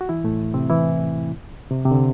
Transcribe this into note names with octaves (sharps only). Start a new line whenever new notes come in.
F#4
E3 E4
A2 A3
C3 C4
E3 E4
C3
C3
D3